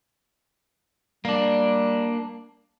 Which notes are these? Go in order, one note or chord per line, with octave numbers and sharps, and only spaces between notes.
G3 A#3 D4